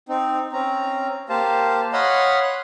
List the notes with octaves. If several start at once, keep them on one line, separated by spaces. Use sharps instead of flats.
C4 D#4
C4 C#4 A#5
A#3 G4 C5 F5 A5
C#5 D#5 F5 F#5 B5 C6
F#6